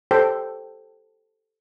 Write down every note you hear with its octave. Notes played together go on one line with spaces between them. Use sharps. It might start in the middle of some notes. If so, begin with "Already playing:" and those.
G4 A4 C5 G5